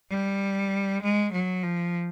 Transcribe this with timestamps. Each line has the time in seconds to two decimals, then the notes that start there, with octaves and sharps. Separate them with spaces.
0.11 G3
1.02 G#3
1.33 F#3
1.63 F3